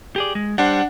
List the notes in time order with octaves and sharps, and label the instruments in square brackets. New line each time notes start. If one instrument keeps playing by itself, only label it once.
[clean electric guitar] G4 G#4 D5
G#3
[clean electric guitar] G3 C5 [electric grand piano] D4 F#5